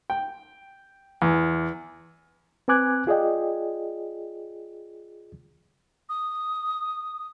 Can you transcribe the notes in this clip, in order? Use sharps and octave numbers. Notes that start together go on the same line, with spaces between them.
G5
E2
C4 B4 G#5 D6 F#6 G#6
F4 G#4 D5 D#5 G5
D#6